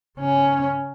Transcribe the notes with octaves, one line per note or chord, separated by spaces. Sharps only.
C#3 C#4